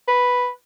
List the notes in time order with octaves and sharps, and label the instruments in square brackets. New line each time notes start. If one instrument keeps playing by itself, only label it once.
[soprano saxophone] B4